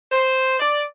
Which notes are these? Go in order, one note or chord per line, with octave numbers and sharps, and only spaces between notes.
C5
D5